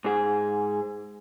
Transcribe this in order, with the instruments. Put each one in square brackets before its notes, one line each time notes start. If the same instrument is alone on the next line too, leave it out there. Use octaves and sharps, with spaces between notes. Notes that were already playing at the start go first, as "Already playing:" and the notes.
[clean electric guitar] G#2 G#4